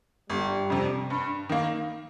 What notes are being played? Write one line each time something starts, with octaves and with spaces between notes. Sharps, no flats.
G1 G3
F2 C3
G2
D#3 A#3